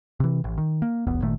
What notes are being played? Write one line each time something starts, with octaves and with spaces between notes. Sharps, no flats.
C3 E3
A1
D#3
A#3
D1 B1 E2 B3
G1 A#2 D#3 A3